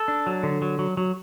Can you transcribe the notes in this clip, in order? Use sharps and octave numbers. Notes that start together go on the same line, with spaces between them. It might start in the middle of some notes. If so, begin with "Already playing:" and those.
Already playing: A4
D4
F#3
D3
F#3
F#3
F#3